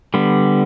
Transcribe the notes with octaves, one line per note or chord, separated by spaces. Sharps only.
D3 G3 B3